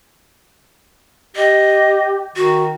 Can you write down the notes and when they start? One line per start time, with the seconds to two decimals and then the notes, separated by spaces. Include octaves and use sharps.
1.36 G4 D#5
2.36 D#3 F#4